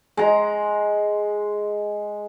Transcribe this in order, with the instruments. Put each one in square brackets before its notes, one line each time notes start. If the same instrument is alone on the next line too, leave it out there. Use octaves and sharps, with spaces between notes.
[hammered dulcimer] G#3 A#5